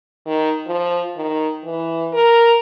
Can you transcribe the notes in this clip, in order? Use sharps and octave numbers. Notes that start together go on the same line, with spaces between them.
D#3
F3
D#3
E3
A#4